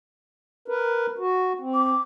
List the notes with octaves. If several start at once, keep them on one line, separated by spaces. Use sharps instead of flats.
A#4 B4
F#4
C4
D6